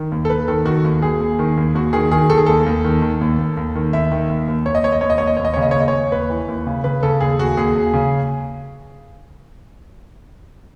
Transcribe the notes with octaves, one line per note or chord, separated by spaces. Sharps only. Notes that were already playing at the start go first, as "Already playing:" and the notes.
Already playing: D#3
D#2
A4
D#2 B4
D#3 A4
D#3 F#4
D#2
D#2 G#4
D#2
D#3
D#2
D#2 F#4
D#3 G#4
D#3 G#4
D#3 A4
G#4
D#2 A4
D#2
D#3
D#3
D#2
D#2
D#2
D#3
D#2 E5
D#3
D#2
D#2
D#2 C#5
D#5
D#2 C#5
D#5
D#2 C#5
D#5
D#2 C#5
D#5
D#2 C#5
D#5
C#3 C#5
D#5
C#5
D#2 D#5
C#5
D#2
D#2 B4
E3
D#2
C#3
C#3 B4
C#3 A4
D#2 G#4
D#2 F#4
D#2 G#4
D#2
C#3